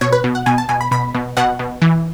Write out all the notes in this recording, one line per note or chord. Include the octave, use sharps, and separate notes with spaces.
B2 C#5
B4
B2
F#5
B2 G#5
A5
B2 G#5
B5
B2 B5
B2
B2 F#5
B2
E3